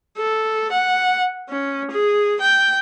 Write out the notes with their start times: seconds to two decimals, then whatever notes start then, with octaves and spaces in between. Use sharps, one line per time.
0.17 A4
0.71 F#5
1.49 C#4
1.90 G#4
2.40 G5